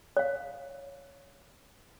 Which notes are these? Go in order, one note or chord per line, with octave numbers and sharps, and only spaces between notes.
C#5 F5